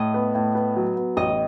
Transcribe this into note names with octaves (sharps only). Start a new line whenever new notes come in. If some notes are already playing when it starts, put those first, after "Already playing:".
Already playing: A2 D#5
B3
A2
B3
F#3
B3
A1 D#5